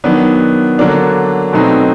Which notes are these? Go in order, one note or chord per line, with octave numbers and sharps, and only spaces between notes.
D#3 F#3 B3 D4
D3 F#3 A#3 D4
B2 F#3 A3 C4 D#4